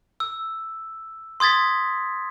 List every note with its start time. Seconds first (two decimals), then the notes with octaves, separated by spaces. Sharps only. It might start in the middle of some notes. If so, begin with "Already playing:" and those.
0.20 E6
1.40 C6 D#6 G#6 A6 B6